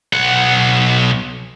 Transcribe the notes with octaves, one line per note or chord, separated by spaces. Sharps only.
B1 F#5